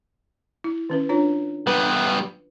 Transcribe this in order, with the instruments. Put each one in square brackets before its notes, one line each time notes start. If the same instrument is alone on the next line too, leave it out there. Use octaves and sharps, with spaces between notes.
[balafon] E4
D#3 C#4 B4
D4 F4 C#5
[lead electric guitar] G3 B3 [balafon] B4